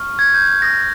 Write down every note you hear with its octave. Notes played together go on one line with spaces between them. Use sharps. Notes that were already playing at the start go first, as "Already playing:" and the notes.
Already playing: C#6 F6
G#6
G6
G#6
D#6 G6 A#6